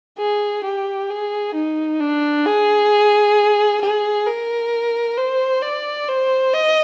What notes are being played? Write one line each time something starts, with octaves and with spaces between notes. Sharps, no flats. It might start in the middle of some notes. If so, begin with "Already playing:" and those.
G#4
G4
G#4
D#4
D4
G#4
G#4
A#4
C5
D5
C5
D#5